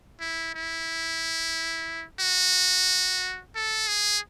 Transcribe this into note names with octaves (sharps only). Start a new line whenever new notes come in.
E4
E4
F#4
A4
G#4